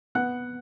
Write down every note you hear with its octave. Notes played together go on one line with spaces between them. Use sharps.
B3 F#5 F#6